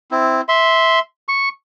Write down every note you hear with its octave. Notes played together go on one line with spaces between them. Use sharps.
C4 E4
E5 C6
C#6